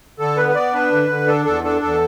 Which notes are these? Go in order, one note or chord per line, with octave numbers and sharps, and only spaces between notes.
D3 A4
B3 B4
B4
B3 D5
D4 B4
D3
D3
D4 A4
E2 A4
D4 A4
E2 A4